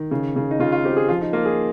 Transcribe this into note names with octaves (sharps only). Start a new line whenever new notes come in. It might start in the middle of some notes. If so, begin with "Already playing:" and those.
Already playing: D#3
C#3
C#3
D#4
C#3 F4
F4
C4 G4
G#4
F3 F4
D#4
A#3 F4
G#4